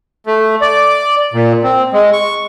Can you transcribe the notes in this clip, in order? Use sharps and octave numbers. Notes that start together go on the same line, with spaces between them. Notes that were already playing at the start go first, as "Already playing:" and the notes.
A3
D5
A#2
C4
G#3
C#6